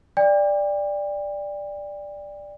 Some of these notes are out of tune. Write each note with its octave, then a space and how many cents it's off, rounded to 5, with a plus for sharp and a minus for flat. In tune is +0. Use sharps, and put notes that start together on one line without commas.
D5 +0 G5 +35